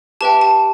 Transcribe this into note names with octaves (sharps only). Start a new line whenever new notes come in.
G4 B4 E5 G5 A5
A5